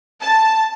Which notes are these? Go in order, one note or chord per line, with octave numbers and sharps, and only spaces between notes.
A5